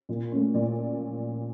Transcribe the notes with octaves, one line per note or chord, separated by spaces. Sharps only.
A#2
A3 C#4
A#2 D5